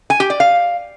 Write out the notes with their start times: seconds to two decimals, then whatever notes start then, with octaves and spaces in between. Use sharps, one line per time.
0.10 G#5
0.20 G4
0.30 D5
0.40 F5